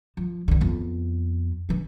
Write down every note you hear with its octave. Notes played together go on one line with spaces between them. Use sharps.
F3
C#2 D3
F2 B3
E3 D4